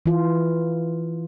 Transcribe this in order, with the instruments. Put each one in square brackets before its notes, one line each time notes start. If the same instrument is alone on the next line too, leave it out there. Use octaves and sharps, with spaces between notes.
[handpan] E3 F4